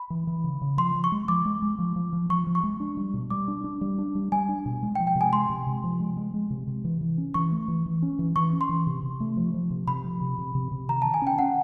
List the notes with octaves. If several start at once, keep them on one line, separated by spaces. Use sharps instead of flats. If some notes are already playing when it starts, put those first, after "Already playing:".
Already playing: B5
E3
E3
C#3
C#3
F3 C6
F3
C#6
G#3
F3 D6
G#3
G#3
F3
F3
F3
F3 C#6
F3
C#6
G#3
D4
G3
B2
G3 D6
D4
D4
G3
D4
G3
G3 G#5
D4
B2
G#3
G5
F3
G5
C3
G#5
G#3 C6
C3
C3
F3
G#3
G#3
G#3
C3
C3
E3
E3
C#4
E3 C#6
A3
E3
E3
C#4
E3
E3 C#6
C#4
C6
E3
C3
C3
A3
F3
F3
C3
C3 B5
F3
C3
C3
C3
C3
D#3 A#5
D#3 A5
G#5
C#4
G5
C#4 F#5